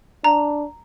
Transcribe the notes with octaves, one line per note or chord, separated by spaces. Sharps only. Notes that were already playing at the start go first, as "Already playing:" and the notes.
D4 A#5